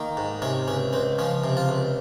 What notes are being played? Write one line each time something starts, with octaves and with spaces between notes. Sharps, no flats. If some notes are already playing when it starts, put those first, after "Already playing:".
Already playing: D#3 A#3
G#2
C3 C#4
C#2 C#4
C#2 C4
F3 C#4
C3
F4
C#2